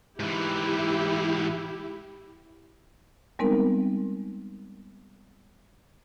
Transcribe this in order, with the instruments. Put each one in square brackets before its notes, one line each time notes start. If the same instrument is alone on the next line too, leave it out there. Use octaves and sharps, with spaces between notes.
[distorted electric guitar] G#2 E3 [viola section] E4 G4
[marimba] G3 G#3 B3 C4 D#4 A#4